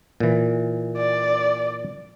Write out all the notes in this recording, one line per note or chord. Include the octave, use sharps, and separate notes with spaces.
A#2 E3
D5